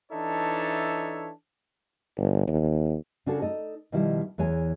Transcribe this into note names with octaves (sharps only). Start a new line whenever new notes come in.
E3 D4 D#4 A4 C#5 E5
G1
D#2
C#3 D4 F4 F#4 G#4 A4
D#4 A4 D#5
B2 D#3 F3 G3 E4
E2 E3 G#4 C#5 G#5